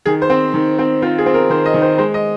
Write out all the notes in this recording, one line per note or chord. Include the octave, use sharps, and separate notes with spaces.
D#3 G#4
C5
C4
D#3
C4
C4 F4
G#4
C4
A#4
D#3 C5
D#5
D#3
C5
G#3 C5
D#5